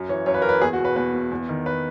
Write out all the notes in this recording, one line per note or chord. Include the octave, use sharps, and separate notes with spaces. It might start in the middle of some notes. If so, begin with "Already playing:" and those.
Already playing: F#2
E3 C#5
F#2 C#5
B4
A#4
E3 B4
E2 G#4
F#4
B2
B4
E2 B4
B2
E2
D#3
B4